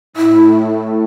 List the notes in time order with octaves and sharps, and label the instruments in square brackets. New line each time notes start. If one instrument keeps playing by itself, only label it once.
[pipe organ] A2 [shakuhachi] E4